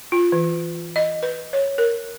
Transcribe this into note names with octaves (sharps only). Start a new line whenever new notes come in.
F4
E3
D#5
B4
C#5
A#4